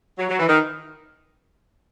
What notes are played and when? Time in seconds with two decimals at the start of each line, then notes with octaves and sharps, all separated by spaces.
0.18 F#3
0.29 F#3
0.40 E3
0.49 D#3